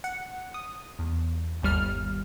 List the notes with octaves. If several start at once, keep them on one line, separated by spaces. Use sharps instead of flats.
F#5
D#6
E2
G1 D#2 G3 F6